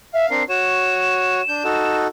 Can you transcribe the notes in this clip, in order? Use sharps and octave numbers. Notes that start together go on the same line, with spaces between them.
E5 F5
C4 D4 A#4 C7
F#4 C#5 E7
D4 G6
D#4 F#4 A4